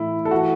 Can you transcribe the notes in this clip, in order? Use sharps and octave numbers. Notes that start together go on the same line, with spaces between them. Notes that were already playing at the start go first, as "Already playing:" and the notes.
Already playing: A2 E3 E4
A4
E3 F#4